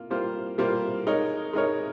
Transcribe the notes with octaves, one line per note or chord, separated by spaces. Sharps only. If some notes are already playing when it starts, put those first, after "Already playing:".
Already playing: A#3 F4
G3 A#3 F4 C5
G3 A#3 F4 C5
G#3 D#4 A#4 C#5
G#3 D#4 A#4 C#5